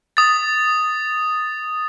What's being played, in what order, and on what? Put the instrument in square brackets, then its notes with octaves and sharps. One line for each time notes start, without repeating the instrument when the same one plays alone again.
[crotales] D#6 A6